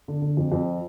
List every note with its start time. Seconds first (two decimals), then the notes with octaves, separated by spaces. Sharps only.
0.08 D3
0.22 D3
0.37 F2
0.52 F2